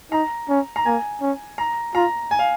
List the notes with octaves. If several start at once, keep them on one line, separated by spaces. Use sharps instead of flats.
D#4 A#5
C#4
A#5
A#3 G#5
C#4
A#5
F4 A#5
G#5
F5